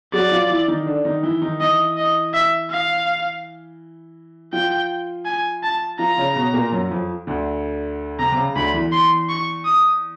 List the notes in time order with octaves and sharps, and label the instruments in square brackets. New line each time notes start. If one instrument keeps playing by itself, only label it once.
[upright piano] F#3 F#4 [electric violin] D5
[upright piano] F3 F4
E3 E4
D#3 D#4
D3 D4
D#3 D#4
E3 E4
D#3 D#4
[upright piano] E3 E4 [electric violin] D#5
[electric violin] D#5
E5
F5
[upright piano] F3 F4 [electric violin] G5
[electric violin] G#5
A5
[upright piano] F3 F4 [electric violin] A#5
[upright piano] C#3 C#4
B2 B3
A#2 A#3
F#2 F#3
F2 F3
D2 D3
[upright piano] C3 [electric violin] A#5
[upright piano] C3
C#3
[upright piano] D2 D3 [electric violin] B5
[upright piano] E2 E3
[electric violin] C6
C#6
D#6